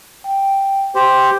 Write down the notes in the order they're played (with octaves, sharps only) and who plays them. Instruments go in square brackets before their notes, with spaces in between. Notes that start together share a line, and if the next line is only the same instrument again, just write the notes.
[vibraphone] G5
[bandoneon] G4 C5 [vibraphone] C6